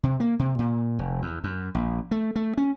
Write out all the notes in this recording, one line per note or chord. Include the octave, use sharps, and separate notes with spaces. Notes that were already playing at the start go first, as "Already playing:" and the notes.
C3
A#3
C3
A#2
F1
E2
F#2
A#1
A3
A3
C#4